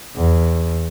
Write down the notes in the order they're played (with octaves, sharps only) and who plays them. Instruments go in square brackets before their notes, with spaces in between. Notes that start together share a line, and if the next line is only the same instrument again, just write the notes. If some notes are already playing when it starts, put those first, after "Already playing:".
[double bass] E2